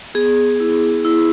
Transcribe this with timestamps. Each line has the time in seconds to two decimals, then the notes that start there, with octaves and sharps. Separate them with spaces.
0.15 B3 G#4
0.60 E4
1.05 E4